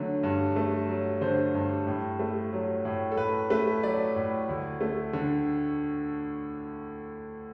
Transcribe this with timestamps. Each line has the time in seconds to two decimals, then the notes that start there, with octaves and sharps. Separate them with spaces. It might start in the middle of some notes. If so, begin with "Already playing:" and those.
Already playing: D3 F#3 A3
0.23 G2
0.56 A3
0.88 F#3
1.21 D3 C5
1.54 G2
1.86 A2
2.20 A3
2.53 F#3
2.85 A2
3.12 A4
3.17 A2 B4
3.50 A3 B4
3.83 F#3 D5
4.16 A2
4.49 D2
4.81 A3
5.13 D3